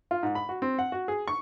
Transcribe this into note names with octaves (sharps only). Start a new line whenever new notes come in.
F4
G#2
B5
F#4
C4
F#5
F#4
G#4
C#6